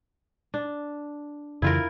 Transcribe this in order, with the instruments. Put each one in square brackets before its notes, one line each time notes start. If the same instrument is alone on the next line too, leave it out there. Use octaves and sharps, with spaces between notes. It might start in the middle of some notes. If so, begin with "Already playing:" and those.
[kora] D4
[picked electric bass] F2 C#3 E3 [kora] E4 F4 A#4